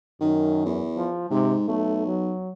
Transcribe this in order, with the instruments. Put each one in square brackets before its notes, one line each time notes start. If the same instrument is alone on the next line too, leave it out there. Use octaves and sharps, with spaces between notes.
[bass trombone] F#2 [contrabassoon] D#3
[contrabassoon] E2
[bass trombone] F3
[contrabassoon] G#2 [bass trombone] C3
[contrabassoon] B1 [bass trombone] A3
[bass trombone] F#3